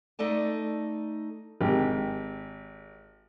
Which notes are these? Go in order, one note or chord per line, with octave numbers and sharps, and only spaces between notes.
A3 D#4 A4 D5 A5
G#1 G4